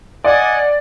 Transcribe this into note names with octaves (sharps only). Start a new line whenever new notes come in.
D5 D#5 F#5 G#5